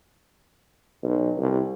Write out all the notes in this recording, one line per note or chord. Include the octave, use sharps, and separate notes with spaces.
B1
C2